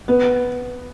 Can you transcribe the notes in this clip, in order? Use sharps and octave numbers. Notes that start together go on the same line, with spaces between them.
B3